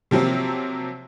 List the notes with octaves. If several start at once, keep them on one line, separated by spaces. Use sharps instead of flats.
C3 F3 F#3 A#3 C4